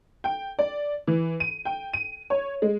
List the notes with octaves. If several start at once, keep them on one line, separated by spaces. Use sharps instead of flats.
G5
D5
E3
D#7
G5
D#7
C#5
G#3